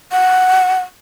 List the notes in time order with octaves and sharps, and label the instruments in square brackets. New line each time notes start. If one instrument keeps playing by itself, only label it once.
[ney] F#5